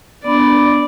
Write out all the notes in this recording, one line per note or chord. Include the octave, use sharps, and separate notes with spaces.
B3 D4 D5 B5